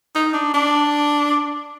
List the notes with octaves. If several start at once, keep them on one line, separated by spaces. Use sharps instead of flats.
D#4
D4
D4